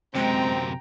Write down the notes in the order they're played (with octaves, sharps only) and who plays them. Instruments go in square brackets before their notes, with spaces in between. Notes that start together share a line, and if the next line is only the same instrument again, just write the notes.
[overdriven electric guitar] F#2 C3 [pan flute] G#3 [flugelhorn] C4 [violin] G5 A#5